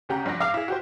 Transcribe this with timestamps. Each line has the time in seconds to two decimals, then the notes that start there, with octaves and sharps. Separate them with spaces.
0.09 D2 C#3 G4 F#5 A#5
0.26 G2 F3 F#5 A#6
0.40 G#2 F5 D6 F6 F7
0.54 E4 G#4
0.68 F#4 G4 C5